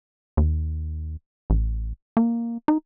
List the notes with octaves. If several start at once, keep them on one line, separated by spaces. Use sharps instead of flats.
D#2
A1
A#3
D#4